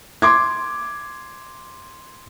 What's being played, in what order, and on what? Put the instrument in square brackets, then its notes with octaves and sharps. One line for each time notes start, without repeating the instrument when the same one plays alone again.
[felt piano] C6 D6 G#6